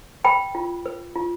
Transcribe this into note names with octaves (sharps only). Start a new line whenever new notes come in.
B4 G5 B5
F4
B4
F4